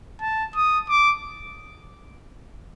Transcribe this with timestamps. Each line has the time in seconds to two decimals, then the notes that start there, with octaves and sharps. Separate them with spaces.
0.21 A5
0.56 D#6
0.89 D6